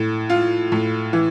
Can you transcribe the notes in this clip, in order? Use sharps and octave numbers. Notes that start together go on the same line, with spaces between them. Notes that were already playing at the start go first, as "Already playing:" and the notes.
Already playing: A2
F4
A2
E3